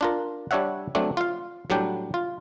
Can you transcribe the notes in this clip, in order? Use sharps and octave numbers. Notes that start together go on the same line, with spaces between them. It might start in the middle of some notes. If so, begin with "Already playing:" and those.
D4 F4 A#4
G3 D4 C#5 E5 F#5
F#3 A3 C4 D4
F4 F5
A2 F#3 G3 D4 G5
F4